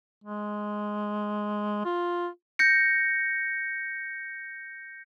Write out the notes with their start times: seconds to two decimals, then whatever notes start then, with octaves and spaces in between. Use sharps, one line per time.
0.24 G#3
1.85 F4
2.59 G6 A#6 C#7